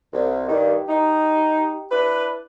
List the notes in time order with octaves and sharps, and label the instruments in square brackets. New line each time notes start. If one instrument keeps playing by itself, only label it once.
[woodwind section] C2
[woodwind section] G2 D#3 [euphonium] G4
[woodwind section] D#4
D4 E4 B4